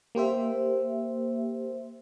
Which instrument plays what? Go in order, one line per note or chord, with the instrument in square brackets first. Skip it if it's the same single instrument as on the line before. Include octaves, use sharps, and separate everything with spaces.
[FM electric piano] A#3 G4 C5 E5